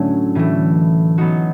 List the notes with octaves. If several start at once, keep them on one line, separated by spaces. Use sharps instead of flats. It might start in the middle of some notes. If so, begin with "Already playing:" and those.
Already playing: A2 D3 F#3 A3 C#4
A2 E3 A3
F#3 B3 D#4 F#4